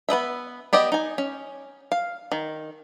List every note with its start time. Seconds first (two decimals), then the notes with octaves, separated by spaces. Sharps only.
0.09 B3 B4 D#5 E5
0.73 B3 G4 D5 D#5
0.92 D#4 G#5
1.18 C#4
1.92 F5
2.32 D#3